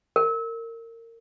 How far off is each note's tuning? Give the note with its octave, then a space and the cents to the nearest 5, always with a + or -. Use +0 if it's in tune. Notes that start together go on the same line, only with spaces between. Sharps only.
A#4 -25